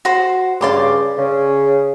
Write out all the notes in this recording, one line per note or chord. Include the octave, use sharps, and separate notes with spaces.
F#4 C5
G2 C#3 D5 C6 D6
C#3